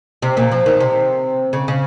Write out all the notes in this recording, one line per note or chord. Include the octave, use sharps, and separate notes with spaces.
C3
A#2
F3
D#3
C3
C#3
C#3